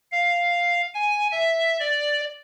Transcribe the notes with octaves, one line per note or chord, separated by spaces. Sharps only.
F5
G#5
E5
D5